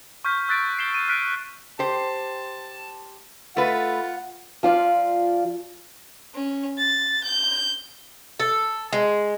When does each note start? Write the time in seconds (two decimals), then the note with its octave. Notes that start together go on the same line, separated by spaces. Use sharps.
0.24 C#6 F6 G6 B6
0.49 E6 F#6 A6 B6 D7
0.78 G6 C7 E7 G7
0.94 D#7
1.08 F6 F#6 B6 D7 D#7
1.79 G4 C5 A5
3.57 A3 F4 B4 F#5
4.63 F3 F4 D5
6.34 C#4
6.78 A6
7.23 G6
8.40 A4
8.93 G#3